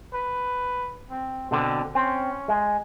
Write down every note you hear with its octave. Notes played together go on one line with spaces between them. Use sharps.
B4
C4
B2 D3 C4
C4 C#4
G#3